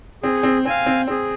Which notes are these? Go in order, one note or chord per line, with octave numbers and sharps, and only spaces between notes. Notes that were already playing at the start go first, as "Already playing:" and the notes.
C4 G#4
C4
C4 F5 G#5
C4
C4 G#4